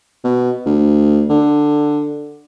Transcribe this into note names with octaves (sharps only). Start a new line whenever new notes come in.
B2
D2
D3